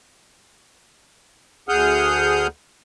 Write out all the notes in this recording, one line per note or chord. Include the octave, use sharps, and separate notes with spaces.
D2 G#4 F#5 D#6 F6 G6